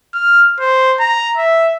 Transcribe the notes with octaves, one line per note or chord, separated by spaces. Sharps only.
F6
C5
A#5
E5